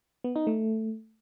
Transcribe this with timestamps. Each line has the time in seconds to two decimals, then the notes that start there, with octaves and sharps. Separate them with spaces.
0.24 B3
0.36 D#4
0.47 A3